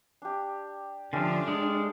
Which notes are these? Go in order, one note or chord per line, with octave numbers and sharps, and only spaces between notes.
D4 G4
D3 F3 A3 C#4 D4 G4
G#3